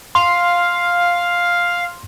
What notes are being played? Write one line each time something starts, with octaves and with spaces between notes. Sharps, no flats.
F5 C6